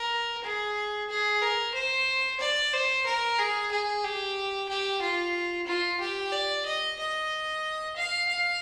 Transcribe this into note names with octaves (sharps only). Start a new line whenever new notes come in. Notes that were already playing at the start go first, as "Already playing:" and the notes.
Already playing: A#4
G#4
G#4
A#4
C5
D5
C5
A#4
G#4
G#4
G4
G4
F4
F4
G4
D5
D#5
D#5
F5
F5